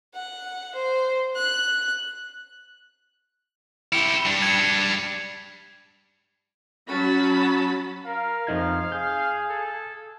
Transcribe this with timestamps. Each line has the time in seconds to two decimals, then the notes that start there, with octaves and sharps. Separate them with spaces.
0.15 F#5
0.75 C5
1.36 F#6
3.93 E4 G4 C#7 G7
4.25 G3 D4
4.42 G#6 C#7
6.88 F#3 C#4 F#4 A5 B5
8.06 A#4 F5
8.47 F2 F3 D#4 G#6
8.92 G#4 G6
9.50 A4